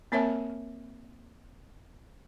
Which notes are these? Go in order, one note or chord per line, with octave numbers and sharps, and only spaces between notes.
A#3 C4 A#4 C#5 E5 A5